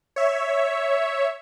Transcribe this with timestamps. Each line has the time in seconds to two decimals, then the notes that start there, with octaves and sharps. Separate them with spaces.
0.16 C#5 E5